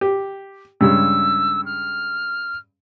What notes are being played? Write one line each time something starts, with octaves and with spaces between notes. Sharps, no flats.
G4
G2 C#3 G#3 E6
F6